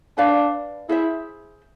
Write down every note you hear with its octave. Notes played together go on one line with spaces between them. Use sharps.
D4 B4 D5 F5
E4 G#4 C5 E5